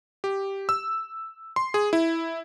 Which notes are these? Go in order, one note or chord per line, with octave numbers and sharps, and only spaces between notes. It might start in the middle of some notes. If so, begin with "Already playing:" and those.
G4
E6
C6
G#4
E4